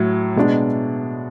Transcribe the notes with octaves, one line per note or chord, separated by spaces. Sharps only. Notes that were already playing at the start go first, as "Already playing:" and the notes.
Already playing: A2 F#3
B2 G#3 D4